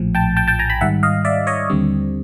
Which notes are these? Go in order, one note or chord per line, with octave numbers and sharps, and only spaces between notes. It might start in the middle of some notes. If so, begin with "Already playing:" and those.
Already playing: A#1 A2 F3
G5 A5
G5 A5
G5 A5
G#5 A#5
A5 B5
G#2 D#3 G3 E5 F#5
D#5 F5
D5 E5
C#5 D#5
D#2 D3 G3 C4